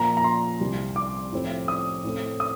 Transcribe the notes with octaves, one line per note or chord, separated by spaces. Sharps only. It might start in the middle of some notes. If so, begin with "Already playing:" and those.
Already playing: A#2 F3 A#3 A#5
A#5
C6
C2 C3 G3
D6
A2 F3 C4
D#6
A2 A3 C4
D#6